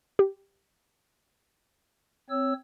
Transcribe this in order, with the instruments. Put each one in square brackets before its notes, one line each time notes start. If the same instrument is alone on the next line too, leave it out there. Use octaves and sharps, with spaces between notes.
[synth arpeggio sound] G4
[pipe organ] C4 C#5 E6